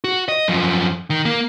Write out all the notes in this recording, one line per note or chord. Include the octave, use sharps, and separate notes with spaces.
F#4
D#5
F#2 F3
D#3
A#3